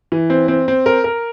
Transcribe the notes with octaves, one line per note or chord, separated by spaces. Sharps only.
E3
C4
C4
C4
A#4
A#4